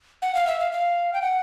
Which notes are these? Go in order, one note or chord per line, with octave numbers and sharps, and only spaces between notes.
F#5
F5
E5
F5
F5
G5
F#5